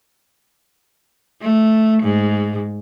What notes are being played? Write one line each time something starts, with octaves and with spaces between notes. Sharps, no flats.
A3
G#2